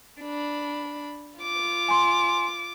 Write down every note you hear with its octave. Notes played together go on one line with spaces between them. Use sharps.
D4 B5
F4 D6
G#5 C6